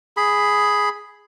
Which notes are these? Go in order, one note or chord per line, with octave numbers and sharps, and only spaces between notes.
G#4 B5